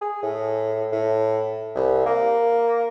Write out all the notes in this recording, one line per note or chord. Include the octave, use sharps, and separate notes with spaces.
G#4
A2
A2
C2
A#3